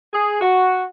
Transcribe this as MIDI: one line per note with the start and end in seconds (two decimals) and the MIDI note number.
0.13 0.37 68
0.41 0.84 66